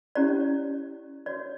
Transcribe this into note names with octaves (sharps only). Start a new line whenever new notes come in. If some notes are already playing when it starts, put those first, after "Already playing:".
C#4 E4 G4 C#5 D5
F#4 C#5 D5